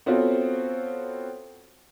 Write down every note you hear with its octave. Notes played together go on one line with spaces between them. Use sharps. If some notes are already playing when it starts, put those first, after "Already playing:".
B3 C4 F4 F#4 A4 C#5